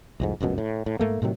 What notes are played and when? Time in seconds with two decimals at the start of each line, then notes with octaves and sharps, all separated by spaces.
0.20 C2 F2 G#2
0.41 F1 C#2 F#2 B2
0.58 A2
0.86 A2
1.00 G#2 A3 A#3
1.22 A2 C3 D#3 F#3